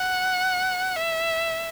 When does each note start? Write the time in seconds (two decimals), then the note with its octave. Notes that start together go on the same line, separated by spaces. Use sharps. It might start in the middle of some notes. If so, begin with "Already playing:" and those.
Already playing: F#5
0.97 E5